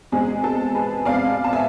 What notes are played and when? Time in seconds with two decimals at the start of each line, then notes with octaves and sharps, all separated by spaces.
0.12 E2 C3 G#3 C4 G#4
0.44 A4
0.75 G#4 B4
1.05 E2 C3 G#3 C4 D5 F5
1.44 A5
1.53 E5 G#5